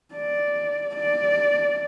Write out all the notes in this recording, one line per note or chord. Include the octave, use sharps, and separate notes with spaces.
D5
D5